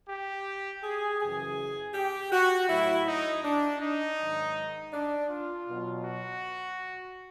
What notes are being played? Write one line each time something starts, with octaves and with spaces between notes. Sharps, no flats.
G4
G#4
F#2 C#3 E3 G#4
G4
F#4
A2 F#3 E4
D#4
D4
D#4
G#2 D#3 F#3
D4
F4
B2 F#3
F#4